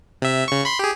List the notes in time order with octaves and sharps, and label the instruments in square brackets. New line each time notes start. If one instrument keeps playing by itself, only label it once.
[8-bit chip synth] C3 E5
C#3 C#6
B5 C6
G4 G#4